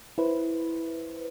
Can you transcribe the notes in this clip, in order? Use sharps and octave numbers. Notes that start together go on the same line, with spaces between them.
E4 B4 C5